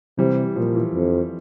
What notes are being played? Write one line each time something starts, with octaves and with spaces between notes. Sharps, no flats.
C3 E3 G3
A#2 F3
E3
F2